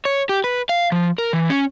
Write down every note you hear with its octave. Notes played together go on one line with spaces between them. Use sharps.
C#5
G4
B4
F5
F3
A#4
E3
C#4